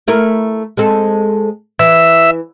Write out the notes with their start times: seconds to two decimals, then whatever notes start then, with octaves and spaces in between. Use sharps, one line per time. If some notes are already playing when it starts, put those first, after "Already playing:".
0.08 A3 E4 A#4
0.77 G#3 C4 A4
1.79 E3 E5